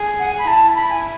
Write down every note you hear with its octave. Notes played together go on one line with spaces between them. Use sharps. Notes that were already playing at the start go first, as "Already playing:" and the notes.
Already playing: G#4
F#5
G#5
B5
E4 A5
B5
G#5